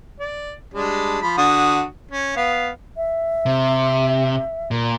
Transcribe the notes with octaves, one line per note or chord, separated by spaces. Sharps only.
D5
G3 G#3 D4
F3 B5
D3 F#4 D#6
C#4
B3 F5
E5
C3
A#2